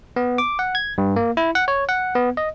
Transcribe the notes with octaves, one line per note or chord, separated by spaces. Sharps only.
B3
D6
F#5
G#6
G2
A#3
E4
F#5
C#5
F#5
B3
D#5